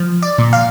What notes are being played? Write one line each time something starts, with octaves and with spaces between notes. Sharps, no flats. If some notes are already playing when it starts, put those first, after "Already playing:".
Already playing: F3
D5
A#2
F5